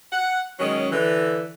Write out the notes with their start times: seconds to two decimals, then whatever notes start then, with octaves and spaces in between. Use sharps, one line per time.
0.12 F#5
0.59 D#3 F#3 G#3 C#4
0.92 D3 E3